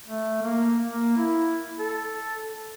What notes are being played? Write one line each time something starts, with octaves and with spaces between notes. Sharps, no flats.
A3
A#3
A#3
E4
A4